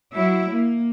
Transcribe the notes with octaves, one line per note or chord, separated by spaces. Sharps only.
F#3 E4 E5
A#3